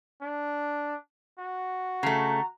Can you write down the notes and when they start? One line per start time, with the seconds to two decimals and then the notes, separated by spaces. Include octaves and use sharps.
0.22 D4
1.39 F#4
2.03 C#3 A3 A#5